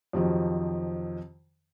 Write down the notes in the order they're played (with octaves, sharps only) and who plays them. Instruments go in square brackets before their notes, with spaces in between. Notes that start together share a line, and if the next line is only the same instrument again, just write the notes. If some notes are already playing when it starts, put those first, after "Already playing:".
[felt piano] F2 C3 D#3 F3 F#3